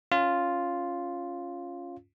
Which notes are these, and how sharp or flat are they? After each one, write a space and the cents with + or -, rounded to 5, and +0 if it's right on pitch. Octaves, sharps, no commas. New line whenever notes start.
C#4 +0 F4 +0